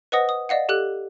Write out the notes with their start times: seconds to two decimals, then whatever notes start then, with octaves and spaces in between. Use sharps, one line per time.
0.12 B4 C5 D#5 F#5 D#6 A#6
0.29 D#6
0.49 D5 D#5 F5 F#5
0.69 G4 A4 F#6